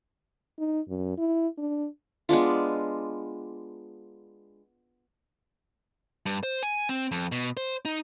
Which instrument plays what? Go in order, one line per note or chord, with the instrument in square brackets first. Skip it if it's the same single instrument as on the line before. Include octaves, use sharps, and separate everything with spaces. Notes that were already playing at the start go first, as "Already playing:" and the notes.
[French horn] D#4
F#2
E4
D4
[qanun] G#3 B3 D4 F4
[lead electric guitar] G2
C5
G#5
C4
F2
B2
C5
D#4